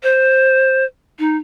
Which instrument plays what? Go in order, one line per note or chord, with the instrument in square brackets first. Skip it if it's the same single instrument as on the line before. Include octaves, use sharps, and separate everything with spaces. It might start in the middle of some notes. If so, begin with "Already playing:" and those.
[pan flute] C5
D#4